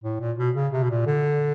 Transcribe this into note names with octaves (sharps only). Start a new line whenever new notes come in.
A2
A#2
B2
C#3
C3
B2
A#2
D3